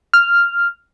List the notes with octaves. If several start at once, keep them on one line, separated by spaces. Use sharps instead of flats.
F6